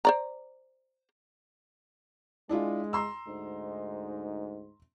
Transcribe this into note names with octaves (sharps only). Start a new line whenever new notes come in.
C5 D5 A#5
G#3 D4 E4 F4
A#5 C6 E6
D2 G#2 D#4